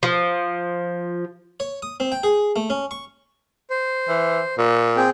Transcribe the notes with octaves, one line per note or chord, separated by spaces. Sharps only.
F3
C#5
D#6
C4
G5
G#4
A3
C#4
C#6
C5
E3
A#2
C4 G#4 G5